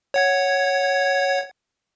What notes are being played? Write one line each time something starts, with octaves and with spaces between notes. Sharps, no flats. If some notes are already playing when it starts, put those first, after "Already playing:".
C#5 F#5 G#6